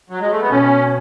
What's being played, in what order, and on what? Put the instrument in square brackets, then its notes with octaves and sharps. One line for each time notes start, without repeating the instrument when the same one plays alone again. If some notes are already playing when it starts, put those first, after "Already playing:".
[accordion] F#3
G#3
A3
B3
[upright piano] B2 [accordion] C#4